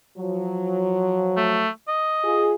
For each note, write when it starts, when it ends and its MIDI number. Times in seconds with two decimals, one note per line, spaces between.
0.18 1.67 53
0.18 1.67 54
1.37 1.69 57
1.88 2.51 75
2.24 2.54 65
2.24 2.54 68